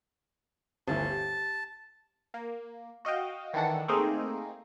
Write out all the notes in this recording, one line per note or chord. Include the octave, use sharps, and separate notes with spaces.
G1 D2 E3 A5
G4
A#3
F#4 D#5 F5 G5
D#3 E3 D4 A4 F#5
A3 A#3 C4 D#4 G#4 A#4